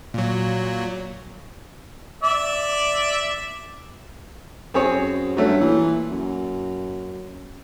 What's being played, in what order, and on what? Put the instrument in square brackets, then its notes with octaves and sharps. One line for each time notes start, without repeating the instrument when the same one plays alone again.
[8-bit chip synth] A#2 F#3
[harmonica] D5 E5
[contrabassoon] F#2 [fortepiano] C4 G#4 C#5
[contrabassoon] G2 [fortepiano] F#3 A3 C#4
[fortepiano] A#2 [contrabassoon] E3
[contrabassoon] F#2